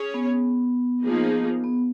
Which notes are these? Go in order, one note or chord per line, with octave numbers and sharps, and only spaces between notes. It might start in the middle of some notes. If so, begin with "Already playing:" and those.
Already playing: C#4 G#4 C#5
B3
F3 A#3 D#4 G#4
B3